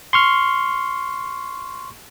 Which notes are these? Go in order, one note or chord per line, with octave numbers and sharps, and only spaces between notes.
C6 C#6 F6